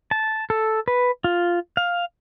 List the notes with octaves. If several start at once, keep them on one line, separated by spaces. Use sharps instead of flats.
A5
A4
B4
F4
F5